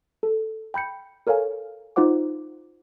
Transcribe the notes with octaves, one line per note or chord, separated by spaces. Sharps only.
A4
G5 B5 G6 C#7
A4 A#4 C#5 F5 G#5
D#4 F4 C5 F#5 D6